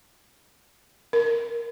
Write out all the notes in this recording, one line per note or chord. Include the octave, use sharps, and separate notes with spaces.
A#4